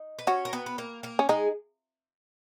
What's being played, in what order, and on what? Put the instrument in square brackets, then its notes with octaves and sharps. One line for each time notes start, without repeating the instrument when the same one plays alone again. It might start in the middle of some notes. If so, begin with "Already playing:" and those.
Already playing: [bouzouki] D#4
B4
[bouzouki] C#4 C#5 [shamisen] F#4
[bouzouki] A#4
B3 B4
B4
A#3 A#4
A#3 A#4
[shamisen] C#4
[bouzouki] G#3 G#4 [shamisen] D#4